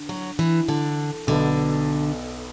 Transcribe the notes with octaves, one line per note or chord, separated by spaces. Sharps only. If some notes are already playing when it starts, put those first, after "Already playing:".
Already playing: D3
F#3
E3
D3
B1 B2 D3 B3